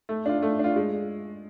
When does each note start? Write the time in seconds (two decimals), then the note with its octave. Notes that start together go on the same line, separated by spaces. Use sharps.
0.09 A3
0.26 D4 F4
0.42 A3
0.59 D4 F4
0.76 G#3